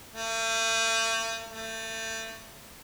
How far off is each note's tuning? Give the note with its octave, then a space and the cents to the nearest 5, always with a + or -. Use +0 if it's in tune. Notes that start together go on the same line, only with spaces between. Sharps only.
A3 +45
A3 +30